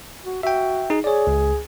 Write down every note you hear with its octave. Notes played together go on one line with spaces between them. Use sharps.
F#4
F#4 E5 G5
D#4 G#4
G#4 C#5 D5
C#2